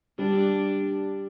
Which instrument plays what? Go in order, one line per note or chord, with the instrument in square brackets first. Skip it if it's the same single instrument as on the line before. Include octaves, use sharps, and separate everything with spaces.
[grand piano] G3 [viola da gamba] D4